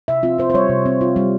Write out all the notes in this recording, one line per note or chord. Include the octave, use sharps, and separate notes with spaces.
C3 E5
C4 F4
F4 C5
C5
G3 C#5
C3
C4
F4
G3